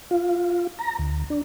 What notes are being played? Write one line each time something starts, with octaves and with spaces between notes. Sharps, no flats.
F4
A#5
D2
D4